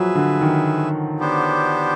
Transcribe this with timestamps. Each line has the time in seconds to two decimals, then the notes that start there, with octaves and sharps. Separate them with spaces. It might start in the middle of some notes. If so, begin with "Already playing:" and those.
Already playing: F3 F#3 G#4 B4 E5
0.15 D3
0.41 D#3
1.20 B3 D4 G4 C5